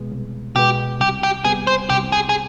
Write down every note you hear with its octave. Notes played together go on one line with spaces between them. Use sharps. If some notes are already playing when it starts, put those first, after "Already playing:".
Already playing: B2 G#3 B3
C2
B2 G#3 B3 G4
C2 G4
G4
C3 G3 B3 G#4
C5
C2 G4
G#4
G#4